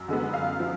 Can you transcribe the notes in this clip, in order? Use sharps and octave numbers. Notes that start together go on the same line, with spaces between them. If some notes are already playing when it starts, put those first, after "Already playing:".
Already playing: F#2
D3 G#3 B3
F#2 F5
F3